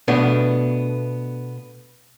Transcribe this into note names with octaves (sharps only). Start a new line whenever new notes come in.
B2 A3 B3 D4